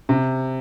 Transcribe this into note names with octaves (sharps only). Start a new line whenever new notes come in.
C3